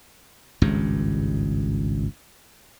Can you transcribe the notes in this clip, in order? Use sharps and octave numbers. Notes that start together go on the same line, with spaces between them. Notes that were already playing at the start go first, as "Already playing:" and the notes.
G#1 C#2 G2